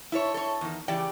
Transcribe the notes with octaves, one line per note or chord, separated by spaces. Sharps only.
E4 A4 C#5
A4 C#5
E2 D#3
C#3 E3 G4 D5 G5